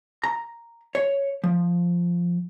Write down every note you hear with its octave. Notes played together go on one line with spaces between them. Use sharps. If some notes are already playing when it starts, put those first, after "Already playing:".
A#5
C#5
F3